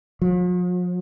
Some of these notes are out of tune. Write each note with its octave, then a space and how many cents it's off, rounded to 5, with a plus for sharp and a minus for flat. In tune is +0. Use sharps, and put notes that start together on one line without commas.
F3 +45